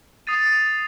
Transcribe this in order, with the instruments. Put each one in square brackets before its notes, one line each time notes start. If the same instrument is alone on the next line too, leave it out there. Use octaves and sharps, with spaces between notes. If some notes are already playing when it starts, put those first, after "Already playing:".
[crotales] D#6 A6 C7 D#7